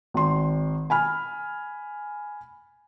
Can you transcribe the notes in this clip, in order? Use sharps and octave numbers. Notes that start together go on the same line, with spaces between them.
G#1 C6
G#5 B5 F6